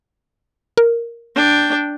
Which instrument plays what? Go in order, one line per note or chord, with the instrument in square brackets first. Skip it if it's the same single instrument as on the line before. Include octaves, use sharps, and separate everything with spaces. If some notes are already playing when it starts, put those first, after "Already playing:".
[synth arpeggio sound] A#4
[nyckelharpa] D4 G5